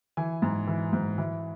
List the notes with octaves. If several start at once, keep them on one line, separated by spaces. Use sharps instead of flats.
E3 G#5
G#2
E3
G#2
E3